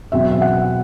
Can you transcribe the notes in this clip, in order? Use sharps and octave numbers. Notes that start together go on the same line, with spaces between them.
E2 B2 F#3 C4 E5
E5
F#5